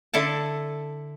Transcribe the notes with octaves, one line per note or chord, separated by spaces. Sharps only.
D3 E4 A4 A5